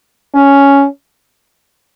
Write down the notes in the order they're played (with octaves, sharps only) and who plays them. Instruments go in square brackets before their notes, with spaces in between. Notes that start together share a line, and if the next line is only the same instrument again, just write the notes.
[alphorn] C#4